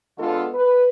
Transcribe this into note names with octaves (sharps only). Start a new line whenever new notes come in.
D3 G#3 B3 F4 F#4 A4
B4